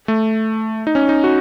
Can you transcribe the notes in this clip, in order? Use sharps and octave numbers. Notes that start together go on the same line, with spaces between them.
A3
D#4
C#4
D#4
F#4